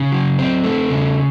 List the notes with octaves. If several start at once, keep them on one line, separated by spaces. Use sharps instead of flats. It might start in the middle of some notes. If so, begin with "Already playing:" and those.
Already playing: C#3
F#3
C4
A3
C#3